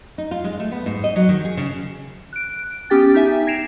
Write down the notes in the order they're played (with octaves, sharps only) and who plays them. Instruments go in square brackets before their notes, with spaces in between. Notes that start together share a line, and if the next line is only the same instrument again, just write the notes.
[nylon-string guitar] D#4
F4
G#3
A3
B3
G#2
D#5
F#3
D#3
G#4
C#3
[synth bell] F#6 D7
B3 C#4 G4 G5 A6
D#4 G4 E5 G#5
G#6 A#6 C7 D7 E7 F7